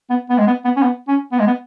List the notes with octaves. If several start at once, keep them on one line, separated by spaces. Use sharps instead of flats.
B3
B3
G#3
B3
B3
C#4
B3
C#4
B3
G#3
B3